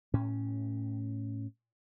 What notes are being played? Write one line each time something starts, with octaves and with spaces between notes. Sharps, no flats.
A2 C#4